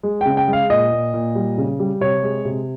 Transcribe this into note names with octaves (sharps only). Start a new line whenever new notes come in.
G#3
C#3 G5
G5
G#3
F5
A#2 D#5
A#2
A#2
G3
C#3
G3
C3 C#5
G#3
C3